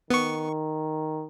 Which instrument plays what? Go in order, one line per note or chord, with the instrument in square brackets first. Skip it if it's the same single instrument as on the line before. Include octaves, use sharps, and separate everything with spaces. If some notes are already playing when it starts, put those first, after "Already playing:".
[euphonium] D#3 [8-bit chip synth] B3 C#6